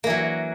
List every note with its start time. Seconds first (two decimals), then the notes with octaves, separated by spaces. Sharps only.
0.04 A#3
0.07 E3
0.10 F#3